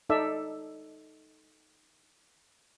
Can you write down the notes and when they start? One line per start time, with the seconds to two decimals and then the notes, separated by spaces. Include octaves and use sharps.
0.10 D#4 A4 D5 E5